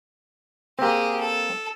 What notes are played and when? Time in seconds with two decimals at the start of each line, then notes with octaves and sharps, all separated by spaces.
0.79 A#3 C4 G4 G#4
1.20 A4